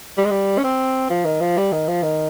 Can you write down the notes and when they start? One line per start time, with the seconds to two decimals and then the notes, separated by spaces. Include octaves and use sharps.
0.17 G3
0.25 G#3
0.31 G3
0.58 C#4
0.64 C4
1.10 F3
1.25 D#3
1.41 F3
1.57 G3
1.72 D#3
1.88 F3
2.03 D#3